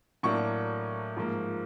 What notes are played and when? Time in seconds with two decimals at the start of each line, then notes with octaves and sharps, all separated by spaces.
0.23 A2 F#3 A#3 D4 C#6
1.17 G#2 F3 A#3